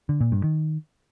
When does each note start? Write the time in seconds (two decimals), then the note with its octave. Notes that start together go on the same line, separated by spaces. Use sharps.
0.09 D3
0.21 A#2
0.32 G2
0.44 D#3